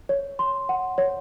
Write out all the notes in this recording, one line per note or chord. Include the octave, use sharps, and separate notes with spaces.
C#5
C6
F#5
C#5